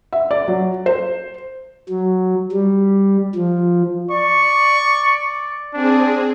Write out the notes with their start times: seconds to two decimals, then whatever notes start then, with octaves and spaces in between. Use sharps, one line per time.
0.13 E5
0.31 D5
0.48 F#3
0.86 C5
1.89 F#3
2.52 G3
3.35 F3
4.10 D5 C#6
5.74 C4 D4 G#4